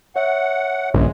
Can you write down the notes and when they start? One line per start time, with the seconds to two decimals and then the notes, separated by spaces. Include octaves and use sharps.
0.16 C#5 E5 F#5
0.94 A#1 G2 C#3 G#3